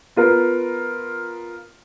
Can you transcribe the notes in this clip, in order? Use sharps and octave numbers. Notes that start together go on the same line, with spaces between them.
B3 F4 A#4